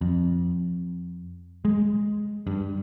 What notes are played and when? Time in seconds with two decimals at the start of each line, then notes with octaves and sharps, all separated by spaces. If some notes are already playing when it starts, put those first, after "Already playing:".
0.01 F2
1.65 G#3
2.47 G2